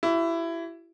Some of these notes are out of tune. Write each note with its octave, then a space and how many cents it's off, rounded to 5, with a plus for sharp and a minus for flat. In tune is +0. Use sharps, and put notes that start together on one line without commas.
E4 +20 G4 -45